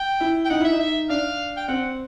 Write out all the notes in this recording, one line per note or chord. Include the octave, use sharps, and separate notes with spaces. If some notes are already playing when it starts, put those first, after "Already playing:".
Already playing: G5
E4
G5
D#4 F#5
E4 E5
D#4
E5
D4 F5
G5
C4 F#5